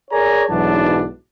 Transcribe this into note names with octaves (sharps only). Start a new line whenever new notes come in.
G#4 A#4 C#5 D5 G#5 A#5
B1 G#2 E3 F#3 D4 A5